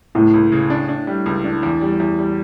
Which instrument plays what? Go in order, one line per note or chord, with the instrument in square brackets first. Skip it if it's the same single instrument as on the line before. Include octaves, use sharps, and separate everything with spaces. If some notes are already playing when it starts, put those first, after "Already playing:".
[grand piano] C#2 [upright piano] A2
[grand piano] C#2
C#3
D4
D4
G3
C#2
D4
E2
G3
E2
G3